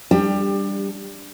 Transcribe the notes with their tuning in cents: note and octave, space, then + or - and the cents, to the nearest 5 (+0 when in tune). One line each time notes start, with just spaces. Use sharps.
G3 +10 D4 +0 G4 +25